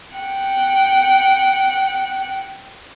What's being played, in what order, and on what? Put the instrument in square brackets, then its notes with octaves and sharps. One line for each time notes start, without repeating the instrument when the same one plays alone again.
[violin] F#5 G5